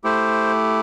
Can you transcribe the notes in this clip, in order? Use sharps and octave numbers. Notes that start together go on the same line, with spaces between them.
A3 E4 G4 C5